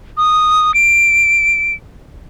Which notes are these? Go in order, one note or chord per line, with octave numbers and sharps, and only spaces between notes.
D#6
D7